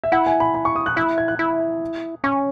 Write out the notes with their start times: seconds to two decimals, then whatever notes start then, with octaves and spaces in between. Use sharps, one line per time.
0.04 E5
0.12 E4 F#5
0.26 G#5
0.40 B5
0.54 B5
0.65 C#6
0.76 D#6
0.86 F#6
0.96 E4 F#6
1.18 G#6
1.28 F#6
1.39 E4
2.24 C#4 C#6